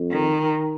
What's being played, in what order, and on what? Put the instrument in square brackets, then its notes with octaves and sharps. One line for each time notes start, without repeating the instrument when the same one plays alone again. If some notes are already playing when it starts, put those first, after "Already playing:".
Already playing: [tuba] F2
[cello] D#3